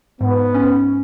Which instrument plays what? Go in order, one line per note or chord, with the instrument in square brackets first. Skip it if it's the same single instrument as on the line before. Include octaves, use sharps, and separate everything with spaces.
[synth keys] G#2 [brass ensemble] B3
[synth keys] C#4